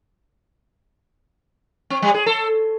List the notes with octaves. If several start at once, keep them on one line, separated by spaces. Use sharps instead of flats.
C4
G3
G#4
A4